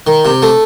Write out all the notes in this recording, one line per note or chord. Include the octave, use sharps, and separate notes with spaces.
D#3
C3
A3